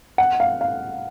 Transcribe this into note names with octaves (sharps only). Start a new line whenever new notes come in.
F#5
F5
F5